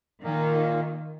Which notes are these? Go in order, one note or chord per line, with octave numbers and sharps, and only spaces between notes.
A#2 D#3 A#3